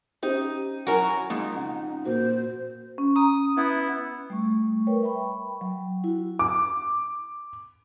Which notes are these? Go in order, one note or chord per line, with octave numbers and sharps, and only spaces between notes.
C#4 D#4 G4 C5
F#3 E4 F#4 A#4 G#5
F2 G#3 D#4
C#3 F#5
A#2 A#3 F#4 C5
C#4
A#5 D#6
B3 E4
G3 A3 C#6
A#4 B4 C#5 G5
E5 G5 B5 C#6
F#3
E4 F#4
D6